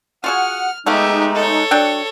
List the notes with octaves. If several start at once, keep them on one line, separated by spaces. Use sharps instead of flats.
F4 F#4 G#4 F#5 F6
G#3 A3 B3 D#4 G4 E5 F5
A4 C#5
F#3 D4 G5